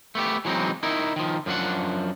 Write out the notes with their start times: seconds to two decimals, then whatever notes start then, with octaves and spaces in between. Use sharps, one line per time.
0.15 A3 B3 G4
0.45 E3 F#3 G#3 C4 D#4
0.83 D#4 E4 A#4
1.16 D#3 F3
1.46 F#2 F3 D4 F#5